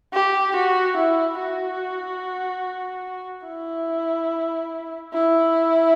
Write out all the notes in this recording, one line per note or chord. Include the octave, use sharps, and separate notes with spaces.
G4
F#4
E4
F#4
E4
E4